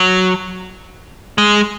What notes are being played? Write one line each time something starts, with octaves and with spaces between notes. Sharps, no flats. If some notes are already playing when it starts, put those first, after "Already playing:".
Already playing: F#3
G#3